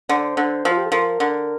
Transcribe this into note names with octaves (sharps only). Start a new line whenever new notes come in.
D3 C5
D3
F3
F4
G4
A4
F3 A#4
D3